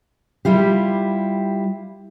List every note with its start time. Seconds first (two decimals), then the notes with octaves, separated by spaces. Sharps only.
0.45 G3 E4 F4 G4